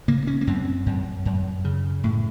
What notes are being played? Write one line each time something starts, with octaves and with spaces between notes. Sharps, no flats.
C#3 A#3
C#4
A#3
F#2 C4
F#2
F#2
C#3
A2